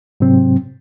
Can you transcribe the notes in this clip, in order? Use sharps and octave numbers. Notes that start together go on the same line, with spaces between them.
G#2 C3 F#3 C4